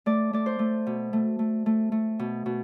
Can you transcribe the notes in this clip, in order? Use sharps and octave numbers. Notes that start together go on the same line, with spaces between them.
A3 D5
A3 D5
C5
A3
B2
A3
A3
A3
A3
B2
B2